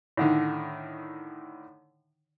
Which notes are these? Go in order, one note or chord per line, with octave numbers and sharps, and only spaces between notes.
A2 D3 D#3